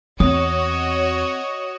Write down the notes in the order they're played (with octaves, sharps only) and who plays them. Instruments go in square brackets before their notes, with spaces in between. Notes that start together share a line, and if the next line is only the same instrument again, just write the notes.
[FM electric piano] E2 [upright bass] C4 [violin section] F#4 C#5 D#5 [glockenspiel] D#6